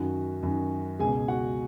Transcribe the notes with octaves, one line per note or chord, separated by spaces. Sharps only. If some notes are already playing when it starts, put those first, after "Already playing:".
Already playing: F#2 D#3 F#4
F#2 D#3
C#2 B2 G#4 G#5
F#4 F#5